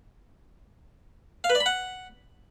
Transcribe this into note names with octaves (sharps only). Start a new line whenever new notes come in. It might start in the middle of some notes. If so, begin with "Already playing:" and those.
F5
B4
D5
B5
F#5